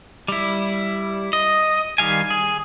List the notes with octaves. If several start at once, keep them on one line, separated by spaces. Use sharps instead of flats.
G3 E4
D#5
D#3 G3 F5 G#5
G#4